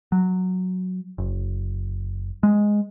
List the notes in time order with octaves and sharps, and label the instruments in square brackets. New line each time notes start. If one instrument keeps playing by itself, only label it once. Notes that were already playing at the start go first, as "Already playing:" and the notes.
[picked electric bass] F#3
F#1
G#3